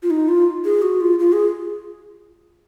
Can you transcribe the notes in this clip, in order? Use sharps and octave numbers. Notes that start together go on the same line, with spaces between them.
F4
D#4
F4
G#4
F#4
F4
F4
G#4